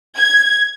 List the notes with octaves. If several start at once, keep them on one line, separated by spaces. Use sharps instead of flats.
G#6